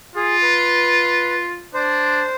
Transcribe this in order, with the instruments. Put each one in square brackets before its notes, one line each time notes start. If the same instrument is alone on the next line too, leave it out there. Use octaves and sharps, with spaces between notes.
[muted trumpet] F4 [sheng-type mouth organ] G#4
[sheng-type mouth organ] B4
[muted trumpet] D4 [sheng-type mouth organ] C5